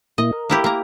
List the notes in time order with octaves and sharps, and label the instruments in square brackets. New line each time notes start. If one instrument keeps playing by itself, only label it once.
[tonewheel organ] A#2 A#3 E4 [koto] D#5
[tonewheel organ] A#4
[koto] A#3 E4 G4
A#3 A#5